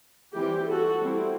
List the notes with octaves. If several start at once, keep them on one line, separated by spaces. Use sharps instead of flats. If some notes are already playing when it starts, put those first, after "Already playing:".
E3 G3 C4 G4
F#4 A4
G3 C4 E4